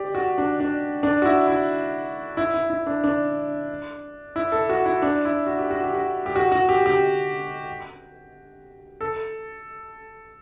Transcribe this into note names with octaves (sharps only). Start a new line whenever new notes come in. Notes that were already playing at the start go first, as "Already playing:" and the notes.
Already playing: G4 D5
F#4
D4
D4
D4
F#4
E4
E4
E4
E4
E4
D4
D4
E4
A4
F#4
E4
D4
E4
F#4
G4
F#4
G4
F#4
G4
F#4
F#4
G4
G4
A4